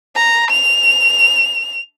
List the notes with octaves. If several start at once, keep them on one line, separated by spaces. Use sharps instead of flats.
A#5
F7